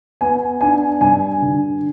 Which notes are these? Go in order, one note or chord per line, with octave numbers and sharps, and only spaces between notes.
B3 G#5
D4 G#5
G2 G#5
D3